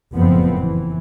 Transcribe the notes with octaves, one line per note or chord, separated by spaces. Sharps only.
F#1 F2 A2 F3 B3 C4
E3